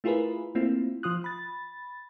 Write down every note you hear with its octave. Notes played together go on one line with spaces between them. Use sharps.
A3 E4 F4 G#4 A#4 B4
A3 A#3 C4 E4 F4
F3 F4 D#6 F#6
B5 A6